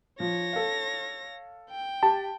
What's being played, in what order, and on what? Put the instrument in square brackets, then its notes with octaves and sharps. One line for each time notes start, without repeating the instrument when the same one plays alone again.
[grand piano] F3 [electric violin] C#5 A#6
[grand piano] A4 F5
[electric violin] G5
[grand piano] G4 [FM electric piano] A5